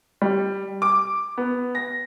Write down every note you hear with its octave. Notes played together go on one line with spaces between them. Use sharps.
G3
D6
B3
A#6